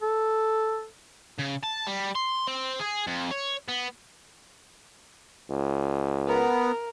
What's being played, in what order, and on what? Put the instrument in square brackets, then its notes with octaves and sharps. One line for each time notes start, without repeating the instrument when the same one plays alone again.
[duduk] A4
[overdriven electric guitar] C#3
A5
G3
C6
C4
G#4
F2
C#5
B3
[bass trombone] C#2
[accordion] B3 [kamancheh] A#4